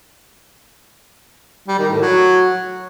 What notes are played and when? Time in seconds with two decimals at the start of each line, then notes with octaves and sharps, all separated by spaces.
1.68 G3
1.79 D#3
1.90 A2
2.01 F#3